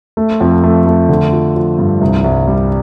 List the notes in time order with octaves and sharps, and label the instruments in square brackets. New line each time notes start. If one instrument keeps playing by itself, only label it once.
[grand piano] A3
F2
A3
A3
D3
F3
F3
G2
C2
C2
G3